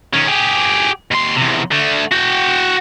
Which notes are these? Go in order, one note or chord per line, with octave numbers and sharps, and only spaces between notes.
D#3 C#4
G4 G#4
D#2 C6
E2 C3
D3 A3
F#4 G5